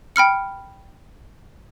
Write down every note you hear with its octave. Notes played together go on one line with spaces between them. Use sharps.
G5 B5 F6 C#7